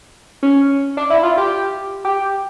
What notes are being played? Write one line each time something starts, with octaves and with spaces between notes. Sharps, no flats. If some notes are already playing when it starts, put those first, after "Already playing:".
C#4
D4
E4
F4
G4
G4